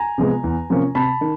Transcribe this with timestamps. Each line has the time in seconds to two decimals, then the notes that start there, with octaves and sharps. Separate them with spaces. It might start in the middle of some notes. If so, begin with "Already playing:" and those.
Already playing: G#5 A#5
0.18 C3 F3 G#3 B3
0.44 E2
0.70 C3 F3 A#3 C#4
0.95 C3 A5 B5
1.21 D#3